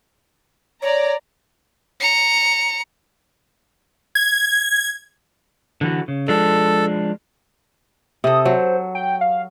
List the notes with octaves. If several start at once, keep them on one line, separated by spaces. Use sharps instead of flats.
C#5 D5 A#5
A#5 C#7
G#6
D3 E3 F#4
C#3
F3 G#3 D4 A4
C3 A4 D#6
F#3 C5
G5
F5